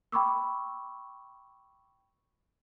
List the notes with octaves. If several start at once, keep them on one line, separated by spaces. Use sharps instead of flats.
G5 B5 C#6 D6 E6